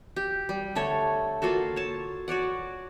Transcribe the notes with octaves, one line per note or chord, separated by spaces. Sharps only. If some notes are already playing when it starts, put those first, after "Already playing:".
G4
G3
D3 A3 A4 C#5
A#3 F4 F#4 A4
C#5 A5
F#4 C#5 D5 F#5